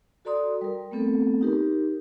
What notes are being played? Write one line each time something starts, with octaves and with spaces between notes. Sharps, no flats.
F#4 A4 D5 A#5 C6 D#6
G3 A#4
A3 B3 C4 A4
D#4 G4 A#4